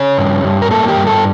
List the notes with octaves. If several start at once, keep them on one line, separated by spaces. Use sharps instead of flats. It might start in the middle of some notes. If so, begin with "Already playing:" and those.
Already playing: C#3 C#5
G2
G2
A#4
A#3 A4
G4
G2
A4